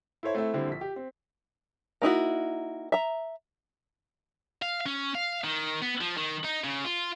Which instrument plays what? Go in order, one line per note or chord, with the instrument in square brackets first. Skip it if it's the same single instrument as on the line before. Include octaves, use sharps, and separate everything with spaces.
[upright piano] E4 A4 C5 C#5 E5
A3 C4 E4 A4 E5
D3 G3 C4 E4
A#1 B6
G4
C4
[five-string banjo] A#3 D#4 E4 F#4
E5 A#5
[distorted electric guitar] F5
C#4
F5
D#3
B3
F3
D#3
D#4
C#3
F4